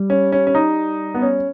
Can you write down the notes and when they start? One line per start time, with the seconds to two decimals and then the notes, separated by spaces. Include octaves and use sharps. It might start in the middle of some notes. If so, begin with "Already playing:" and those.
Already playing: G3
0.10 C#4
0.32 C#4
0.47 C#4
0.55 D#4
1.15 B3
1.22 C#4